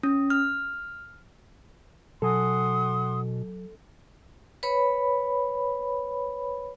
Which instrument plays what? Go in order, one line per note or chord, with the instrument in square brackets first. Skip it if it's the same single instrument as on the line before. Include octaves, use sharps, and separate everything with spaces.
[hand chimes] C#4
F6
[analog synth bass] B2 [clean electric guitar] F#3 G#5 [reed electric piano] A4 [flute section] F#5 C6 D#6
[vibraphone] B4 C#5 B5